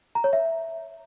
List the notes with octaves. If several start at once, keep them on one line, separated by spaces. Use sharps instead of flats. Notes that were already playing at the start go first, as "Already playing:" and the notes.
A#5
C#5
E5